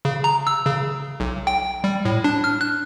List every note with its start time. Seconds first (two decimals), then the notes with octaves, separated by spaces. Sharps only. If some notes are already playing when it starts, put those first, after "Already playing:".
0.05 C#3
0.24 A#5
0.47 E6
0.66 C#3
1.20 B1
1.47 G5
1.84 G3
2.05 A2
2.24 D4
2.44 F6
2.61 F#6